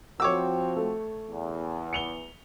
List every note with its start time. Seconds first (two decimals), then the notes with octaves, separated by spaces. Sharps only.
0.20 F3 C4 F#4 C#5 G5 D6 E6
0.76 A3
1.28 E2
1.93 C#7 F7 G7